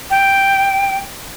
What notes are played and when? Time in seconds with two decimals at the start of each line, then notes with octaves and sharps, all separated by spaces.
0.10 G5